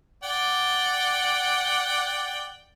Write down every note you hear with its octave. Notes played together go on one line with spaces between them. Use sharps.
D5 F#5 G5